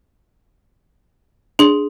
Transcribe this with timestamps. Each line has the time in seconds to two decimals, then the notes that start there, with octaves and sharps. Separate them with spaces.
1.59 D4 G#4 F#7